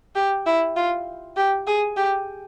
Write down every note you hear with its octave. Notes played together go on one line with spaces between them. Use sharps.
G4
E4
F4
G4
G#4
G4